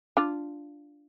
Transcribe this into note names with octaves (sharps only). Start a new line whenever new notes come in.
D4 F4